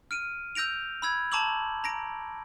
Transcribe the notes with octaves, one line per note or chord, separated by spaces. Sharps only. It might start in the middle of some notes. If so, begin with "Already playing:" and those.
F6 D7 D#7
E6 G6 A#6 D7 F7
B5 E6 G#6
A5 A#5 C#6 D6 E6 F#7
A#5 A#6 D7